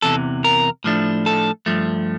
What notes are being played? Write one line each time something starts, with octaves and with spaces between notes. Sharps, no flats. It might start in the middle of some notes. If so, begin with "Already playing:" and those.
E2 C3 E3 A4
A#4
A2 F3 A3 D4
A4
G2 F3 A3